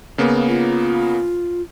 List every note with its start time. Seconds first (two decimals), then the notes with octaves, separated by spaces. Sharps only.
0.18 C#3 A#3 B3
0.48 F4